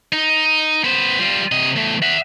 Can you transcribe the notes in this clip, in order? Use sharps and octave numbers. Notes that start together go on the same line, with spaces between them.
D#4
B3 C5
G3 F4
C3 D#5
E2 A3
E5 F#5